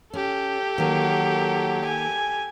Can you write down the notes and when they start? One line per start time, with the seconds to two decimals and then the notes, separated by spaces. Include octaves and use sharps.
0.13 C#4 G4 A4
0.78 D#3 F#3 A#3
1.85 G#5